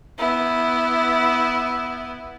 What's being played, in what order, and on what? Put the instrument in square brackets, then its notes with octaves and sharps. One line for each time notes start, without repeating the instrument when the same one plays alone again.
[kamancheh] B3 E4